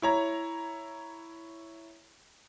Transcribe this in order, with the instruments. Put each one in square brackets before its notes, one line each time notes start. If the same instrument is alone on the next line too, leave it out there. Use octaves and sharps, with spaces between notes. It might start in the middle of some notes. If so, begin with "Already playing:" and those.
[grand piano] E4 C#5 A#5